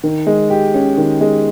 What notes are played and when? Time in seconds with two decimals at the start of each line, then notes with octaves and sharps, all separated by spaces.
0.03 D#3
0.27 G#3
0.50 G4
0.74 C#4
0.98 D#3
1.21 G#3